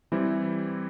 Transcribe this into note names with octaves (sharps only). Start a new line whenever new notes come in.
E3 G3 C4 E4